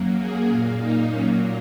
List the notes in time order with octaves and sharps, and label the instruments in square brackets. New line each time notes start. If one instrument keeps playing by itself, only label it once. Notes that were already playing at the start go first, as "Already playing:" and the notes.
Already playing: [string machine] F#2 F#3 A#3
G#4
A#2 A#3
D#4
A#2 F#3 A#3 C#4